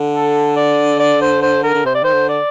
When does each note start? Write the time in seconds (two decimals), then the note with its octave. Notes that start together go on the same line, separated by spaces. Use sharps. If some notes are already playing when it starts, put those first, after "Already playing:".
Already playing: D3
0.13 A4
0.56 D5
1.00 D5
1.21 C5
1.42 C5
1.63 A#4
1.74 D3
1.85 C3 C5
1.95 D5
2.03 D#3 C5
2.14 D3
2.29 D5